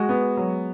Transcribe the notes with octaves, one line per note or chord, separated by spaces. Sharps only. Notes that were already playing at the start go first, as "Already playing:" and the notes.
Already playing: G#3 F#4
B3
F#3